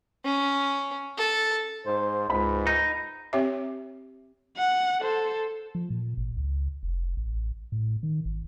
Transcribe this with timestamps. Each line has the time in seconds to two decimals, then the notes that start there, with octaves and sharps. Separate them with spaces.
0.25 C#4
1.18 A4
1.85 G#2 C5
2.30 C#2 G#2 B5
2.67 D#4
3.33 C4 G4 C#5 E5
4.57 F#5
5.01 A4 C5
5.75 F3
5.90 A#2
6.17 G#1
6.37 C#2
6.83 F1
7.17 A1
7.72 A2
8.03 D#3
8.25 G#1